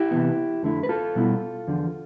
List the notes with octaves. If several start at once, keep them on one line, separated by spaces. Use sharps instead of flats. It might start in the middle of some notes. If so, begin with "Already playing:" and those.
Already playing: E4 G4
C3 E3 B3
F2 D3 A3 E4
B4
F4 A4
B2 G3 B3 E4
E2 D3 F3